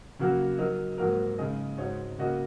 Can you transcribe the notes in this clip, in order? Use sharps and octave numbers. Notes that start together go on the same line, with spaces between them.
C#3 F#3 A#3 F#4 A#4
F#3 D#4 A#4 D#5
G#2 F#3 A#3 F#4 A#4
C#3 G#3 D#4 G#4 D#5
G#2 G#3 D#4 F#4 C#5
C#3 A#3 F#4 D#5